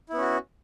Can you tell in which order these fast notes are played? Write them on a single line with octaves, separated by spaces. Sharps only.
E4 B3 C#4 F#4